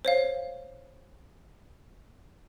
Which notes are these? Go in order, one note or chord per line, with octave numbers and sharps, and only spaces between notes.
C5 C#5 F5